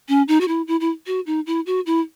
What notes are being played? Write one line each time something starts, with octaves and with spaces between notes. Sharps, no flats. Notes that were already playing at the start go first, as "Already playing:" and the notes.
C#4
D#4
F#4
E4
E4
E4
F#4
D#4
E4
F#4
E4